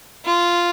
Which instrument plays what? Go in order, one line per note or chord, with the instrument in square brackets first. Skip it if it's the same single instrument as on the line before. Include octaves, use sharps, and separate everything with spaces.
[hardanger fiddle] F4